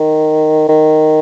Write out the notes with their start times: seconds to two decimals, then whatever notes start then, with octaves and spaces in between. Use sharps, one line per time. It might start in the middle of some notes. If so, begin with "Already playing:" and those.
Already playing: D#3
0.69 D#3